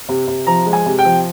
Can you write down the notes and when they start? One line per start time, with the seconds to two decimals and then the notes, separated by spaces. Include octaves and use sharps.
0.09 C3
0.27 C3
0.47 F3 A#5
0.66 G#3
0.73 G#5
0.86 C3
0.98 G5
1.05 F3